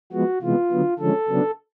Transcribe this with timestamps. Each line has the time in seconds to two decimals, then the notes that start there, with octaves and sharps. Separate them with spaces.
0.12 F3 G#3 B3 F#4
0.42 C3 E3 G#3 B3 F4
0.71 D3 F#3 B3
0.99 D3 F3 G#3 C#4 A4
1.28 C#3 F#3 B3 D4